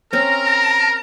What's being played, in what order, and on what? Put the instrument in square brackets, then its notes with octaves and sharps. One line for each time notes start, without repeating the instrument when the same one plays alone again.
[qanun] C4 C#4 [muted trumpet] A#4 [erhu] A#5